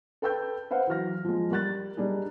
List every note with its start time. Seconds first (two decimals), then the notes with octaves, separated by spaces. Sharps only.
0.22 A4 B4 G5 E6 G6
0.71 B4 C5 F5 F#5
0.87 E3 F#3 F6 A#6
1.25 F3 G#3
1.51 G3 A#4 F#6 A6
1.97 G3 D4 D#4 G#4